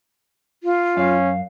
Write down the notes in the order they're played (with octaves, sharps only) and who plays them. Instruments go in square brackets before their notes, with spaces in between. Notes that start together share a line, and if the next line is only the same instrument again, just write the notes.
[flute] F4
[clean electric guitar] F#2 F5 [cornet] C#4